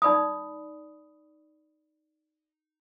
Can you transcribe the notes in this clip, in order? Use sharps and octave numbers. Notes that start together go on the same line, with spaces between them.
D#4 D5 B5 D#6